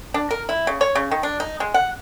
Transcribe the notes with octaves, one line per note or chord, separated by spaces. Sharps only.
D4
A#4
E4
C#3
C#5
C#3
D#3
D4
D#4
G#3
F#5